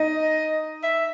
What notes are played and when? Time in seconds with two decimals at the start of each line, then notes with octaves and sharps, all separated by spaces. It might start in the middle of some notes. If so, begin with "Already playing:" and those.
Already playing: D#4 D#5
0.83 E5